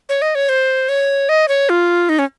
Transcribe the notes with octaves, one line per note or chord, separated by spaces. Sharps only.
C#5
D#5
C#5
C5
C#5
D#5
C#5
F4
D#4
C#4